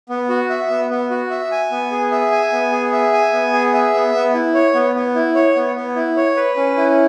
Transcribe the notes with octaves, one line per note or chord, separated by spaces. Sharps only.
B3
F#4
E5
B3
B3
F#4
E5
G#5
B3
G#4
E5
G#5
B3
G#4
E5
G#5
B3
G#4
E5
B3
B3
E4
C#5
B3
B3
E4
C#5
B3
B3
E4
C#5
B4
C#4
E4